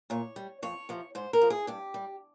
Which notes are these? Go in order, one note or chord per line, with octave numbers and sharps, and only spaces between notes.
A#2 C#5
G3
F2 C#5
C3 F3
G#2 C5
A#4
F3
G#4
G2 G4
G3